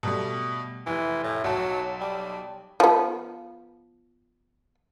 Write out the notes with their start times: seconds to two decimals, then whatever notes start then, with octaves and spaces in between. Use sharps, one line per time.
0.03 B2 G3 A3
0.87 F1 E3
1.23 A2
1.44 B1 F#3 A5
2.01 G3
2.80 F3 B3